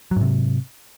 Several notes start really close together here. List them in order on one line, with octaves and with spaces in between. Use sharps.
F#3 G#2 C3